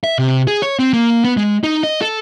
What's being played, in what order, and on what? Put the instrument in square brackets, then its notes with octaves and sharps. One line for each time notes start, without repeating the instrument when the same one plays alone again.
[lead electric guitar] E5
C3
G#4
C#5
C4
A#3
B3
G#3
D#4
D#5
A4